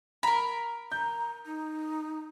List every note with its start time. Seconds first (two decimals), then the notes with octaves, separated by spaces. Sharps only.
0.23 A#4 A#5 B5
0.92 A#5 G6
1.46 D#4